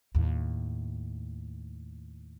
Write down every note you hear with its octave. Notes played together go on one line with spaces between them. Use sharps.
D#2 A2